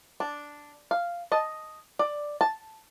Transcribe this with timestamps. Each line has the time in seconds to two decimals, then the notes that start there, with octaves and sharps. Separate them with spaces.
0.20 D4
0.91 F5
1.32 D#5 A5
1.99 D5
2.41 A5